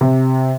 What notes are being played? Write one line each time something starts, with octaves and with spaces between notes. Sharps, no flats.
C3